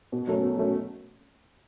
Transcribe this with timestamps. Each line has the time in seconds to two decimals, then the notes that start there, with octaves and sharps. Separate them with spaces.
0.12 B2
0.27 F#3 A3 C#4
0.43 B2
0.57 F#3 A3 C#4